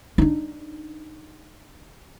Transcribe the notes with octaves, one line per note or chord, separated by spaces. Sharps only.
D4 D#4